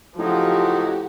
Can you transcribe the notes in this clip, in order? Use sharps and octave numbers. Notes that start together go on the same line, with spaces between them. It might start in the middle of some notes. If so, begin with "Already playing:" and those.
A2 C#3 F3 F#3 D#4 F#4 G4